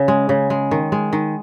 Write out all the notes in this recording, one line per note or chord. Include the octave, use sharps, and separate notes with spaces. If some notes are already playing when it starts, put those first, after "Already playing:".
Already playing: C#3
G#3
C#3
G#3
D#3
G#3
D#3